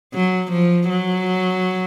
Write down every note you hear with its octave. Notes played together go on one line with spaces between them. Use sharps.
F#3
F3
F#3